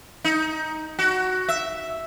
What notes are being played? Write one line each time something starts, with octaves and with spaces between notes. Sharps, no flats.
D#4
F#4
E5